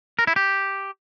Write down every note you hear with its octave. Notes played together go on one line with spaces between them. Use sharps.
A#4
E4
G4